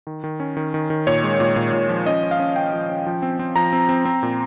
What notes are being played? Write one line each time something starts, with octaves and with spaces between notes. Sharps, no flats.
D#3
D#3
C#4
D#3
D#3
D#3
A#2 C#5
G#3
A#2
A#2
A#2
F3
C#4 D#5
C#4
F5
C#4
C#4 G5
F3
C#4
F3
C4
C4
F3 A#5
C4
C4
C4
A#2